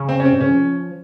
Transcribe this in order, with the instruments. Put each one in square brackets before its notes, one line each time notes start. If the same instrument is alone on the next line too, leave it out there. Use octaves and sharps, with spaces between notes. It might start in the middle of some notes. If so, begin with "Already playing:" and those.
Already playing: [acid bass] C#3
[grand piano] C4
C#4
[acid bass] C3 [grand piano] C4
[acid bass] G2
[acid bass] C#3 [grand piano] C#4
[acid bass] F3